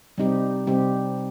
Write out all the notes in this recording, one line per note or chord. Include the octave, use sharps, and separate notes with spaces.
C3 G3 C4 D#4 G4
C3 G3 C4 D#4 G4